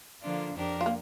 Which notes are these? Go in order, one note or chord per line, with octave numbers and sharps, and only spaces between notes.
D3 F3 A#3 D4 F4
F2 F3 D4 G4 A#4
F4
A#3